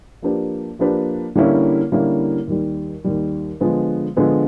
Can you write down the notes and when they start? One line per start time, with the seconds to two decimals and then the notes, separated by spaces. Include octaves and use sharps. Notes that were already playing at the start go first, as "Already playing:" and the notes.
0.22 F3 A#3 D4 G4 B4
0.79 F3 A#3 D4 G4 B4
1.35 D3 G3 A#3 C#4 E4
1.92 D3 G3 A#3 C#4 E4
2.47 D#2 D#3 G3
3.04 D#2 D#3 G3
3.61 D3 F3 G#3 B3
4.16 D3 F3 G#3 B3